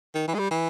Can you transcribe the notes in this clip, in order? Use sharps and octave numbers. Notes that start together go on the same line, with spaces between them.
D#3
E3
G#3
G3
E3